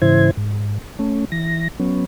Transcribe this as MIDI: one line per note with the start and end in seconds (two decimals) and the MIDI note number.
0.02 0.31 44
0.02 0.31 49
0.02 0.31 52
0.02 0.31 64
0.02 0.31 72
0.02 0.31 92
0.37 0.78 44
0.99 1.25 57
0.99 1.25 61
1.32 1.68 52
1.32 1.68 94
1.80 2.05 54
1.80 2.05 59
1.80 2.05 61